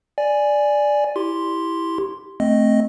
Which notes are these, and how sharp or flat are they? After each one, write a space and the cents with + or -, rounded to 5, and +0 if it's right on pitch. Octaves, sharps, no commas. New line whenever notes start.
D5 +0 G#5 +0
E4 +0 G4 +0 C6 +0
A3 +0 C4 +0 D#5 +0